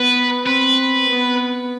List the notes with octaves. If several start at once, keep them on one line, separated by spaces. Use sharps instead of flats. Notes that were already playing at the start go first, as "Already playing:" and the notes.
Already playing: B3 B4
C4 B4
B3